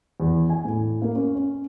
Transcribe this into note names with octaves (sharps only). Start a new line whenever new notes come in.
E2
G#5
A2
A#3
C#4
C#4